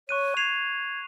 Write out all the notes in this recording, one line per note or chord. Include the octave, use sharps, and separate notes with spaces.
C#5 C#6 F#6 D#7
G#6 C7 E7 F7